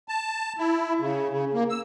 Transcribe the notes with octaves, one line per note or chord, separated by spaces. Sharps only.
A5
E4
C#3
C#3
A#3
E6